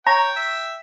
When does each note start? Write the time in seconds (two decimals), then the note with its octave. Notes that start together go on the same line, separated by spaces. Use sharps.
0.07 C#5 G5 A#5
0.36 E5